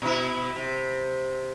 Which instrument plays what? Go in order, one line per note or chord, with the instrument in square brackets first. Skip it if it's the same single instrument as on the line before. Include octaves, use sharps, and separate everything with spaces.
[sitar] B2 E4
C3